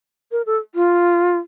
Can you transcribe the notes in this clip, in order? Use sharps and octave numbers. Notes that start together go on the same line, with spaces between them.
A#4
A4
F4